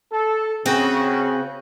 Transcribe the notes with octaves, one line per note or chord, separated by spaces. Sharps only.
A4
C#3 C4 F#4 G#4